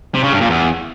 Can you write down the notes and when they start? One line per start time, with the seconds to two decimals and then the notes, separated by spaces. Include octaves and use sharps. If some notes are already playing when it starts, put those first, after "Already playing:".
0.14 C3
0.23 C#3
0.32 G2
0.41 A#2
0.50 E2